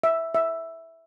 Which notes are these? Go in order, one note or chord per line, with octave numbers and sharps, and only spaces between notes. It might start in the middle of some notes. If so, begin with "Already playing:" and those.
E5
E5